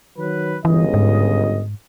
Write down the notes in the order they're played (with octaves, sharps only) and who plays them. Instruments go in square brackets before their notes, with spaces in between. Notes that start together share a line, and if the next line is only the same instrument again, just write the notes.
[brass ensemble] D#3 F#3 B4
[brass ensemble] G1 C#2 D#5 [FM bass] E3
[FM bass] G#2